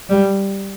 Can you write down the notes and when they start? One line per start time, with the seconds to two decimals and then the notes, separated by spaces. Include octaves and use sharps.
0.09 G3